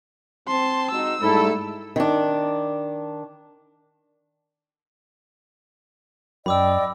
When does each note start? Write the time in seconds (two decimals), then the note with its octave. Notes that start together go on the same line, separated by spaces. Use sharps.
0.48 C4 A5 C6
0.91 G#3 D#4 F#4 E6
1.22 G#2 G3 A3 E4 A4
1.96 D#3 D4
6.46 F#2 D5 D#5 G5 B5 D6 E6
6.67 D6